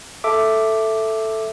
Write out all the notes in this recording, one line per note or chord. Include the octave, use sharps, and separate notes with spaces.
A4 E5 D6